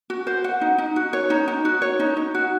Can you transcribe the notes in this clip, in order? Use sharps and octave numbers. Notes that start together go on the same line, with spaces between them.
F#4
C5
F#5
D#4
D#4
F#4
C#5
D#4
D#4
F#4
C#5
D#4
D#4
F#4